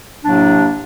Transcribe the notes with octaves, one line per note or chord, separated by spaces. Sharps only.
A2 C3 F#3 A#3 D4